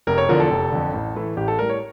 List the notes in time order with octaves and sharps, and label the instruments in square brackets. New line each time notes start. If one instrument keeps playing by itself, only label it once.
[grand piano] F1 A#4
C#5
E2 D3 F3 A#4
A4
F1
F2 D3
A1
A2 E3 A3
A1 G4
A4
A2 G3 A#4
C#5